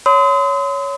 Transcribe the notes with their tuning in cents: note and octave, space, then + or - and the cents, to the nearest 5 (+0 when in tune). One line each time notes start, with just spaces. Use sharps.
C#5 +15 C6 -40 D#6 +40